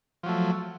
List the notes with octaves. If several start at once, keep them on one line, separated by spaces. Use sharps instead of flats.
F3 F#3 A3